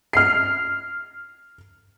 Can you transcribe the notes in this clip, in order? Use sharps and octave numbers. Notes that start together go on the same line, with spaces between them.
F6 C7